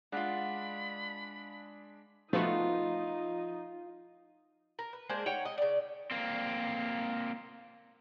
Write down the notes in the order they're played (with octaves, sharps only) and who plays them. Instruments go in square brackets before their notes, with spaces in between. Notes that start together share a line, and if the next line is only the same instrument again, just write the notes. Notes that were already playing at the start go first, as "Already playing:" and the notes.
[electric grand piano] G#3 D4 [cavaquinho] F4 F5 F#5 [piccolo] B5
[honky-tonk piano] F3 [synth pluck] A3 B3 F#4 [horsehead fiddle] D#4 [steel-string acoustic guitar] F4
[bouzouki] A#4
B4
G#3 A#3 D4 C5
D#4 C#5 F#5 G5
D#5
C#3 D5
[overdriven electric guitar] A#3 C4